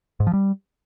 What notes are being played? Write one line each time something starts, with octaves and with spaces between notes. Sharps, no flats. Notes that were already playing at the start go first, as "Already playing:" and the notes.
G#2
F3
G3